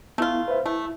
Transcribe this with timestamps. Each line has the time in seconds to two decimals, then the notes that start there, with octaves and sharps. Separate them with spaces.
0.18 A3 B3 E4 F4
0.48 B4 C5 E5
0.66 A3 E4